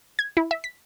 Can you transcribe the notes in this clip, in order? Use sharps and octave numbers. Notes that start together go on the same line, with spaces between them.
G#6
E4
E5
B6